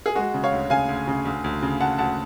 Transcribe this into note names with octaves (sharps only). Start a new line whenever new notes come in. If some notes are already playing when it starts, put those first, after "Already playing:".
G#4
G#3 F#4
C#3
C#5 F5
D2
C#3 F5 G#5
D2
C#3
D2
D2
C#3
D2 F#5 A5
D2 F#5 A5